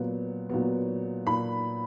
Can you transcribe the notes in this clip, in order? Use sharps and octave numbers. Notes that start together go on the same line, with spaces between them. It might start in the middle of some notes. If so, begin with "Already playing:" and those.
Already playing: A#2 F#3 B3
A#2 F#3 B3
A#2 B5